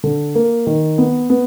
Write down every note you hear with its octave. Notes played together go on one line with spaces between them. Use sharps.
D3
A#3
D#3
B3
B3